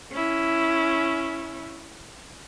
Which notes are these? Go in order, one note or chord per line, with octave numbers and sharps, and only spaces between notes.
C#4 E4